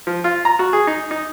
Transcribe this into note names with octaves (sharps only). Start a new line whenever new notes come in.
F3
F4
A#5
F#4
G#4
D#4
D#4